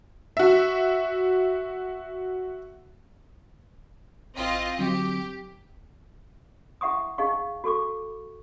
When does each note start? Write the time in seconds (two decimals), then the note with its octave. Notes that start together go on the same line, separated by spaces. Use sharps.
0.37 F#4 E5
4.36 A1 C4 F4 D#5 F5 C6
4.79 D3 F#3 C4 G4
6.81 E4 E5 F#5 C#6 D#6
7.18 D#4 G#4 D#5 F5 C#6
7.64 F#4 A4 C#6 D6